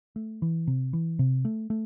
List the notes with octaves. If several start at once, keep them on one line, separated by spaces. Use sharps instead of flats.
A3
E3
C3
E3
C3
A3
A3